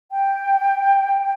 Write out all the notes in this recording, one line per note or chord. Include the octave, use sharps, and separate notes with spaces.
G5